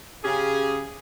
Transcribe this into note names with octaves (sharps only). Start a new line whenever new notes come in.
C#3 C#4 G4 G#4